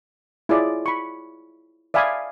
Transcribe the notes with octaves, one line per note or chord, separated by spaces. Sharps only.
E4 F4 G#4 C#5 D5 E5
B5 C#6
D5 E5 F5 G#5 B5 D#6